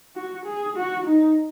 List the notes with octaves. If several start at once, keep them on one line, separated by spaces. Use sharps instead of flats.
F#4
G#4
F#4
D#4